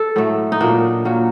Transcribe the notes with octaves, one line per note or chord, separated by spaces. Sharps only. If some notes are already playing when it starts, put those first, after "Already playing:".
Already playing: A4
A2 F#3 A3
D#4
A#2 F#3 A#3 D4
A#2 F#3 A#3